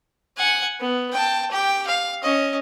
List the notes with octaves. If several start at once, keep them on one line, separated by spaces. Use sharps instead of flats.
F#5 G#5
B3
G5 A5
G4 G5
F5
C#4 D#5